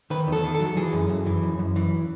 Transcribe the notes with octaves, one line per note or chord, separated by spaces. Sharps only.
D#3 B4
E2 A4
D#3
A4
F#3
E3 G#4
F#2
F#2
E3
F#2
F#2
E3